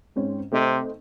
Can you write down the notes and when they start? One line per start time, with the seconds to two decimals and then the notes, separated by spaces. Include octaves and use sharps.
0.16 G#2 C4 C#4
0.53 C3 A3 C4 D#4